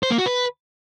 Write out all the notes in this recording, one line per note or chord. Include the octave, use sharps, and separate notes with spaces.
C5
A#3
F#4
B4